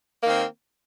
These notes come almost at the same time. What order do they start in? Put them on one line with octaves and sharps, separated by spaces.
A#3 D#3 C4